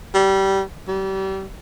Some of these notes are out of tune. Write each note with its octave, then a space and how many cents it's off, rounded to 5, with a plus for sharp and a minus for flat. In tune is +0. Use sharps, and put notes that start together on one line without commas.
G3 -20
G3 -30